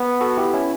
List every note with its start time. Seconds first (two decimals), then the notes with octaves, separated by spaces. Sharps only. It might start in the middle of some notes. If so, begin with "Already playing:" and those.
Already playing: B3
0.21 F#4 A4
0.37 E4 G4
0.54 C#4 E4